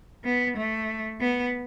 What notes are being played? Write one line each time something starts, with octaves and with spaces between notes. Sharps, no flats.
B3
A3
B3